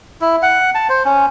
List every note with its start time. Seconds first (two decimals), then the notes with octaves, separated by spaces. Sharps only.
0.21 E4
0.42 F#5
0.75 A5
0.89 C5
1.05 C#4